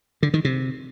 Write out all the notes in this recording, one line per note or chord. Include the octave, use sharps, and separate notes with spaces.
D3
D#3
C3